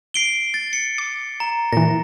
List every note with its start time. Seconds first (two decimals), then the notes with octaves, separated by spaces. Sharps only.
0.14 C7 D7 G7
0.54 A6
0.73 C#7
0.98 D6
1.40 A#5
1.73 A#2 E3 A#6